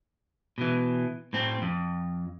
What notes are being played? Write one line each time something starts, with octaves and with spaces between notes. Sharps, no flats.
B2 E3
A2 C4
F2